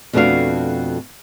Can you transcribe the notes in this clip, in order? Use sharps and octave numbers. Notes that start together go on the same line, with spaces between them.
F2 B2 A3 D4 F#4 F5